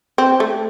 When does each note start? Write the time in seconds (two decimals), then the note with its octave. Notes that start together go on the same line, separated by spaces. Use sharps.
0.18 C4
0.40 A3